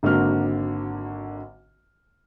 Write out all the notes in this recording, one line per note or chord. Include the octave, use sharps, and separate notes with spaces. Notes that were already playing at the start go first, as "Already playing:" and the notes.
G#1 D3 A#3 F#4 F6